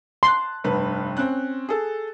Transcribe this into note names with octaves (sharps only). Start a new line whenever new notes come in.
A5 C6 F#6
F1 G2 B4
C4 C#4 F#6
G#4 A4